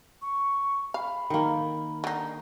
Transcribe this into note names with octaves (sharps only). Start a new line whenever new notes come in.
C#6
F5 B5
D#3 A#3
D3 D#4